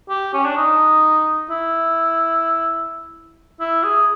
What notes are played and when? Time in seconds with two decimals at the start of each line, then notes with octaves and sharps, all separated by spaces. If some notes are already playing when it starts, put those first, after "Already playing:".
0.09 G4
0.34 C#4
0.45 D4
0.57 D#4
1.50 E4
3.60 E4
3.84 G#4